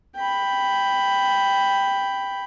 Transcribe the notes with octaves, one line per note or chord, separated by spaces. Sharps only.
G5 B5